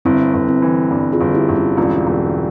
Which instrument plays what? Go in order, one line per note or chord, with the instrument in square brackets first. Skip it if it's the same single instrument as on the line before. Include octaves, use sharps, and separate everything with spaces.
[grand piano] G1 [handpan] C4 E4
[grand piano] G1
[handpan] C4 E4
[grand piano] E3
G2
[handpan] F4 G#4
[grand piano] G1
[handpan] E4 G4
[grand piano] G1
[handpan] C#4 F4
[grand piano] E1 [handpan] C#4 F4
[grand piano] E1